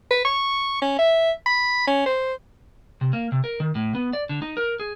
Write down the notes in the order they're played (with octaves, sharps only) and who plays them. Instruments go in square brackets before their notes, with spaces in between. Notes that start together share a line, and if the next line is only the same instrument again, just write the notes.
[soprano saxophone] B4
C#6
C#4
E5
B5
C#4
C5
[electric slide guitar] C3
A#3
C3
A#4
D#3
A2
B3
D5
D3
D#4
A#4
G#4